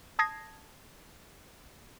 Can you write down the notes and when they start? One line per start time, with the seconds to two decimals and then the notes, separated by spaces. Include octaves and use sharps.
0.19 A5 D#6 G#6 A#6 C7